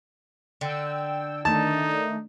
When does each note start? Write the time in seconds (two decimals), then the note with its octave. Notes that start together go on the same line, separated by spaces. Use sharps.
0.61 D3 G5 E6
1.45 D#3 A3 D4 D#4 A5